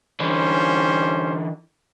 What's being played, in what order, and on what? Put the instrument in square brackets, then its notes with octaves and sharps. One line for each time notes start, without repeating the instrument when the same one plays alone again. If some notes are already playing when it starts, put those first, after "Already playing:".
[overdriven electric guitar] D3 E3 [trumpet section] G3 C#4 C5